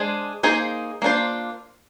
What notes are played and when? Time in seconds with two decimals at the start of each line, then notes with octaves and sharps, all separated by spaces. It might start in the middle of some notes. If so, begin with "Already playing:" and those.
Already playing: G#3 D4 G#4 C5
0.43 A#3 D#4 G#4 C5
1.02 A#3 D4 F4 C5